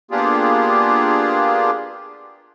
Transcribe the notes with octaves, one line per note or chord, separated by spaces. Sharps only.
A#3 B3 D4 F4 G4 G#4